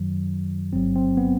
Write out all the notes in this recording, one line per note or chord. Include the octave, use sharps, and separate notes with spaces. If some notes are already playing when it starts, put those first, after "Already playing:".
Already playing: F#2 D#3 F#3
G1 G2 F#3 C4
C4
B3